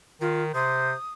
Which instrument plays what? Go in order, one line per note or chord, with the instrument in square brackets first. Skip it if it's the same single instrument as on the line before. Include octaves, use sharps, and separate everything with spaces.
[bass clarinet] D#3 [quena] F4
[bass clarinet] C3 [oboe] C5 [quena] D#6